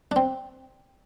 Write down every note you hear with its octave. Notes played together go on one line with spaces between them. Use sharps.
D4
C4